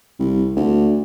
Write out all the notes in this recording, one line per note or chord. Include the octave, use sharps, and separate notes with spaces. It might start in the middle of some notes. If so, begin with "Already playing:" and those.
C2
D2